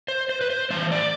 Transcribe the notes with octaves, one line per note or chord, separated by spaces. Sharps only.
C5
C5
B4
C5
A2 E3 A3 C5
D5